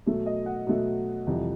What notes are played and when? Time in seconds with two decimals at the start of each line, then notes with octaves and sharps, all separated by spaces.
0.06 B2 F#3 A3
0.26 D#5
0.46 F#5
0.67 B2 F#3 A3
1.27 F2 C3 E3 G3